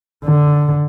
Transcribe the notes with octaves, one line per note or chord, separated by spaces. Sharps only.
D3